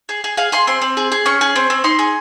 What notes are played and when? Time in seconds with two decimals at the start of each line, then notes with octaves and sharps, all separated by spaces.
0.09 G#4
0.24 G#4
0.37 G#4 F5
0.52 G#4 C6
0.67 C4 C6
0.81 C4
0.97 G#4
1.12 G#4
1.26 C#4 C#6
1.41 G#4
1.56 C4
1.70 C4
1.84 D#4 C6
1.99 G#4